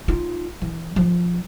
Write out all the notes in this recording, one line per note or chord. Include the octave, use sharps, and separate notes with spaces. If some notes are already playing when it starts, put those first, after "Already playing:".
D#4 F4
E3
F3